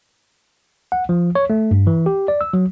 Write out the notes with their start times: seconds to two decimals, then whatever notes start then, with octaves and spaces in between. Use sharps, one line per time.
0.92 F#5
1.09 F3
1.35 C#5
1.50 A3
1.71 G2
1.87 E3
2.06 G4
2.28 D5
2.41 E6
2.53 F#3